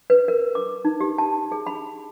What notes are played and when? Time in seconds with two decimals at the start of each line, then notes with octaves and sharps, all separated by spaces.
0.10 B4
0.28 A#4
0.55 D6
0.85 D#4
1.01 G4
1.18 A5
1.52 G#4
1.67 B5